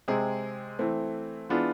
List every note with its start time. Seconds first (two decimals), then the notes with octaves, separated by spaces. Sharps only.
0.08 C3 G#3 C4 G#4
0.79 E3 A3 C4
1.49 E3 B3 D4 F4 G#4